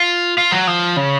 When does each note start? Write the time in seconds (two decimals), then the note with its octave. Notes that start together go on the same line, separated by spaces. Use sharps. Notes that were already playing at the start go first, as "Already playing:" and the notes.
Already playing: F4
0.38 F4
0.52 F#3
0.67 F3
0.97 C#3